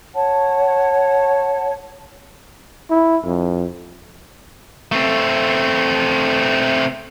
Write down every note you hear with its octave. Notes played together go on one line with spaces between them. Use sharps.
C#5 F#5 A5
E4
F2
A3 C4